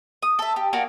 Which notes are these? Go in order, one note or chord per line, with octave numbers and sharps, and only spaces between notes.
D#6
A4 E5
G4
A#3 D4 F#4 F5